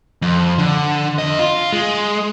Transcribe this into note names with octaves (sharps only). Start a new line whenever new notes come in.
F2
D3
F2 D#5
F4
G#3